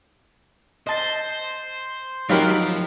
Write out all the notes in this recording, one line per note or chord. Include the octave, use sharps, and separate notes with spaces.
C5 D#5 A5
F3 F#3 D#4 G4 A#4 F5 B5